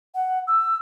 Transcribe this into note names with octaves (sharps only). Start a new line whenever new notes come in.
F#5
E6